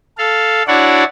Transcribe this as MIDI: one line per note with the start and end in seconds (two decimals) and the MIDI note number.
0.18 0.63 69
0.18 0.63 77
0.67 1.04 62
0.67 1.04 64
0.67 1.04 66
0.67 1.04 73
0.67 1.04 74
0.67 1.04 78